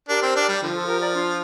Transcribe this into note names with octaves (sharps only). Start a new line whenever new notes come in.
D4 G4 A#4
C4
D4
G3
D3 F3
F4 A4
G4 A#4
A#4 D5
D4 F4